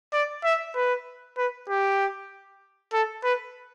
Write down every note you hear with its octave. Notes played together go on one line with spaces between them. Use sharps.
D5
E5
B4
B4
G4
A4
B4